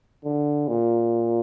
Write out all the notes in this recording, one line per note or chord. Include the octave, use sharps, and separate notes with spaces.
D3
A#2